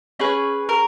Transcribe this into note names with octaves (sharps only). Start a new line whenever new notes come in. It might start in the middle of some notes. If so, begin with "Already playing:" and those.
C#4 G#4 B4
A#4